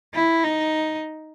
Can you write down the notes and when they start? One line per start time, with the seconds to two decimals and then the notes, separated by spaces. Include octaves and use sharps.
0.14 E4
0.44 D#4